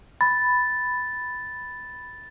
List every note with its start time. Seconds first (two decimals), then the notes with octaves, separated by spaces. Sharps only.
0.21 B5 A6